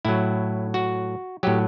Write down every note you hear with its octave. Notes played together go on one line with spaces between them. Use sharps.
A2 F#3 E4
F#4
A2 F#3 G4